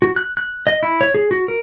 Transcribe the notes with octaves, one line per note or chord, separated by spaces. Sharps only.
F#4
F#6
F#6
D#5
E4
C#5
G#4
F#4
A#4